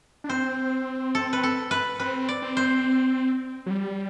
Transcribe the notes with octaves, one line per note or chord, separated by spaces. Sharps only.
D4
C4 C5
A4
B4
A4
B4
C4 B4
D5
C4
C5
F#3
G3